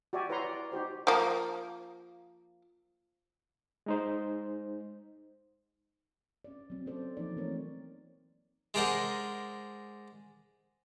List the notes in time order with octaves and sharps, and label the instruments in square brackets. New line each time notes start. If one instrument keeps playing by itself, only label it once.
[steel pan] F#4 G4 D5 E5 G#5
E4 B4 C#5 F#5 A#5 C6
D5
D#4 F#4 G4 C5
[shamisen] F3 A#3
[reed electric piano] G#3 D#4 C5
[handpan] C#4 D5
F#3 C4
C4 C#4 A4 C5 D5
E3 F3 A#3 C#4 D#4 D5
E3 A3 A#3 C4 A#4 C#5
[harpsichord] G#3 D4 A#4 C5 D#5 F#5